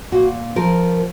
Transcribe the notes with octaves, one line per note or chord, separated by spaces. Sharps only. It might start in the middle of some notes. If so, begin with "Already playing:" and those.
A#2 F#4
F3 A#4